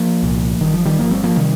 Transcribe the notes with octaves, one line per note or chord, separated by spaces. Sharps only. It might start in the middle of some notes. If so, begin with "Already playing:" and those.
Already playing: F3 A#3
C2 A#2
G1 G2 D#3
F3
D#3 G3
G1 G2 F3 A#3
G3 C4
F3 A#3
C3 D#3 G3